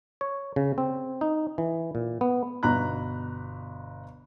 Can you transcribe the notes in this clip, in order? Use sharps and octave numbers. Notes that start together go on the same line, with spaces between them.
C#5
C#3
C4
D#4
E3
A#2
B3
G1 B2 A#5 B5 F#6